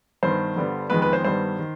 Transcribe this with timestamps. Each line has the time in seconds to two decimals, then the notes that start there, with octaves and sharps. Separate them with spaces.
0.23 G2 D#3 B3 C5
0.56 G2 D3 G3 B3
0.90 F2 D#3 G#3 B3 B4
1.02 B4
1.13 C5
1.24 G2 D#3 G3 B3 C5
1.59 D#3